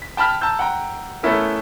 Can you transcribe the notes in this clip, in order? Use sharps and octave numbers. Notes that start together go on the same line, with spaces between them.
B6
G5 A5 B5 F6 B6
A5 A#5 E6 G6
F#5 G5 A#5
A3 B3 C#4 E4 A#4